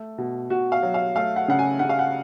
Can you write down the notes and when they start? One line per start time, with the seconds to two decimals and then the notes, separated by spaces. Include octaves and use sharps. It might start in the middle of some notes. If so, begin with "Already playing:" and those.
Already playing: A3
0.18 B2
0.50 B2 F#4
0.72 F5
0.83 F#3
0.94 F5
1.16 A3 F5
1.36 F#5
1.48 C#3 F#5
1.59 G#5
1.79 C#3 F#5
1.89 F5
1.99 F#5